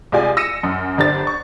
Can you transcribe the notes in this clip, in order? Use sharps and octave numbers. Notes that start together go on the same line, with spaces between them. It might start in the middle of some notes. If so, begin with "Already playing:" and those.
C2 G#3 F4 G4 D5 G#5
E6 A#6 C#7 D#7 E7
F#2
G1 D3 D4 G4 C5 A6
C#6